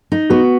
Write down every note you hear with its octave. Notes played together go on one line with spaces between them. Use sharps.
D#4
B3 F#4